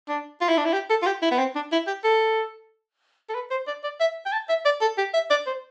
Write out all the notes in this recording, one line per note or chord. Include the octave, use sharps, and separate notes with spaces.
D4
F4
E4
D4
E4
G4
A4
F4
G4
E4
B3
C4
D4
E4
G4
A4
A4
B4
C5
D5
D5
E5
G5
A5
E5
D5
A4
G4
E5
D5
C5